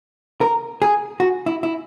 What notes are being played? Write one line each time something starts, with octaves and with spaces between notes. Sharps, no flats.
A#4
G#4
F#4
E4
E4